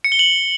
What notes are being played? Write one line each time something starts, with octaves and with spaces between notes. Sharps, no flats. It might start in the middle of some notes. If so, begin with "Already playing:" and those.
C#7
G7
F#7